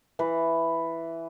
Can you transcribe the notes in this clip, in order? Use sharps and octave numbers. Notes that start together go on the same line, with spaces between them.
E3 B4